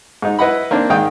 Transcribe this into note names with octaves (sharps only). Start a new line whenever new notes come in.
G#2 D#4
E4 B4 D#5 F#5 B5
A#3 C4 D4
G#2 D#3 F5 G5 D#6